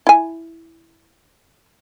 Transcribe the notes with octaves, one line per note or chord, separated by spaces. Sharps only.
E4 G#5